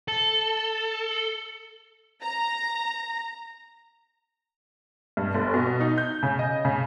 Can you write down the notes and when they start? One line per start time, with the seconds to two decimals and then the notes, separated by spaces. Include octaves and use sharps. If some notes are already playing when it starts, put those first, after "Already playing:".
0.08 A4
2.22 A#5
5.17 G2
5.34 G1
5.54 B2
5.81 D#4
5.98 G6
6.23 C#3
6.39 D#5
6.65 C#3